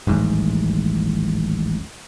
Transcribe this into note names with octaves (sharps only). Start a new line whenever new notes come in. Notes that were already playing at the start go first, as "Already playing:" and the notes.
D#1 A1 G#2